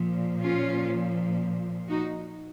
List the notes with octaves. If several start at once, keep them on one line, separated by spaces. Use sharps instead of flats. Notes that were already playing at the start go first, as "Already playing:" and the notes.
Already playing: A#2 F3
C#4 F4
D#4 F#4